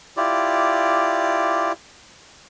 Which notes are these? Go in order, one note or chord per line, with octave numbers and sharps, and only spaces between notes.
E4 F4 G4 D5